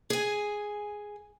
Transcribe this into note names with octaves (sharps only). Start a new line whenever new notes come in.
G#4 G#5